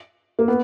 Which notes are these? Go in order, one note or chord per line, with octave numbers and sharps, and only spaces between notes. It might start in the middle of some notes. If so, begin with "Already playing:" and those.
A#3
B3